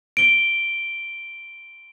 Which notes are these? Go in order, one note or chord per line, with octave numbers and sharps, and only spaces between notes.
D7 G7